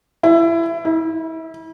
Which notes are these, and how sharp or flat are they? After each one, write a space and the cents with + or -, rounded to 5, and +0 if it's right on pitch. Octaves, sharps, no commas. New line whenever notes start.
E4 +20
E4 -35